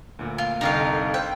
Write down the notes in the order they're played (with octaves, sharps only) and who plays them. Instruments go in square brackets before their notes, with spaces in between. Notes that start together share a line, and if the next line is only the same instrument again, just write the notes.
[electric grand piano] D2 A#2
[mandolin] F4
[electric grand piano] C2 D3 [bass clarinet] F2 [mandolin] D#4 A#4 F5
[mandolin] B4 G5 [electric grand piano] C5 E6